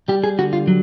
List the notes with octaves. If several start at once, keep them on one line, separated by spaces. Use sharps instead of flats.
G3 G4
G#4
D3 F#4
F4
F#3